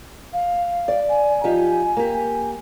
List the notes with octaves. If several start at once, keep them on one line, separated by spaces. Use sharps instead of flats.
F5
D5
G#5
F3 D#4 G4
A#3 G4